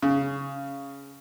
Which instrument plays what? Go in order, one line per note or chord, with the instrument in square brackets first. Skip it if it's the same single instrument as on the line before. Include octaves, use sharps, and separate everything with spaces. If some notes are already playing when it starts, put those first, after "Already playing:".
[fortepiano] C#3